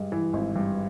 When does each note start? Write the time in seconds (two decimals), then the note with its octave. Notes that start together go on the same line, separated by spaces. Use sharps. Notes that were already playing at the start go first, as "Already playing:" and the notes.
Already playing: G2 G#3
0.12 E3
0.33 G#1
0.56 G2